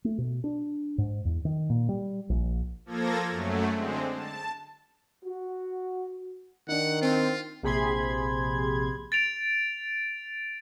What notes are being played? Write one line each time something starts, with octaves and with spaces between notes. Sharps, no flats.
A3
B2
D4
G#2
E2
D#3
A#2
G3
A#1
F3 A#3 A4 G#6 A#6
F#2 F#3 A3
D3 G#3 C4
A5
F#4
D#3 D4 D#4 F#5
C4 F4
A#1 C3 G#4 B5 C6 G#6
A6 D7 F7